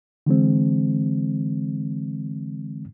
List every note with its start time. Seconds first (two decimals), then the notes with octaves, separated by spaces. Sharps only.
0.26 D3 E3 G#3 C4